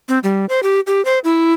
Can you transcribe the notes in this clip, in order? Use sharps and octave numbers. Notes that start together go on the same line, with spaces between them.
C4
G3
C5
G4
G4
C5
E4